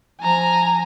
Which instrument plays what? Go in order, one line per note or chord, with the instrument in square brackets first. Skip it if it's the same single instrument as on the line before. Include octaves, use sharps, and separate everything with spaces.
[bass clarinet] F3 [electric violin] G#5 A#5